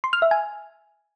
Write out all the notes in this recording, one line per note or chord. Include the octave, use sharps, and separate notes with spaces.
C6
F6
E5
G#5